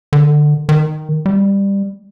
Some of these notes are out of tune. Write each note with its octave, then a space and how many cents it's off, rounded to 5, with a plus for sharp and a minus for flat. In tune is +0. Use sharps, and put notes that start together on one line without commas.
D3 +20
D#3 -5
G3 +15